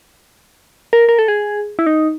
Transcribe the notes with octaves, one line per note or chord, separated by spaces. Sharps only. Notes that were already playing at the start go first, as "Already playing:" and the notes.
A#4
A#4
A4
G#4
E4
D#4